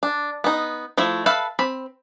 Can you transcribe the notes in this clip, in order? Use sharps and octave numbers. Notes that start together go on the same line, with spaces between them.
D4
B3 D#4
F3 A3 E4
A4 B4 E5 F5 B5
C4 B5